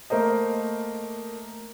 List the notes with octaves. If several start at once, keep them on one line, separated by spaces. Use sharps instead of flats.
A3 A#3 A#4 C5 D#5